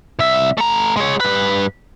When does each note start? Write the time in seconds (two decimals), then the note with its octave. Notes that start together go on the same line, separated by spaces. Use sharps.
0.19 C2 E5
0.58 A3 A#5
0.96 G#3 C#5
1.20 G2 B4